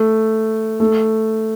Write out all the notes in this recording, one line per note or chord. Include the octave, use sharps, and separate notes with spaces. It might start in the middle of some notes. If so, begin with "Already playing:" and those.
Already playing: A3
A3